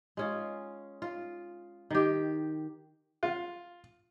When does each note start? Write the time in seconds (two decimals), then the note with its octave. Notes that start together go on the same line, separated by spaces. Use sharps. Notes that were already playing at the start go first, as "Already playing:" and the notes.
0.17 G#3 C#4 F4
1.02 F4
1.90 D#3 G4
3.23 F4